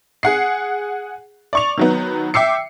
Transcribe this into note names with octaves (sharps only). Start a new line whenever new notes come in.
G#4 F#5 C7
D5 C#6 F7
D#3 F#3 B3
E5 G5 D6 E6 C7 C#7